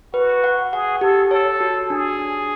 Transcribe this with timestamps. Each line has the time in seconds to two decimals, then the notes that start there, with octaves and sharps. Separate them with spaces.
0.14 F#4 B4
0.44 F#5
0.73 G#4 F#5
1.01 G4 A4
1.31 A4 C#5
1.60 F#4
1.90 D4 G#4
2.20 D4